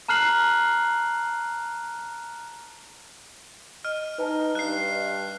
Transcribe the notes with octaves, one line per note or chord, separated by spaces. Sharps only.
A5 A#5 F6 F#6 C7 F#7
D#5 F6
D#4 B4 G#5 A5
G2 F#6 C7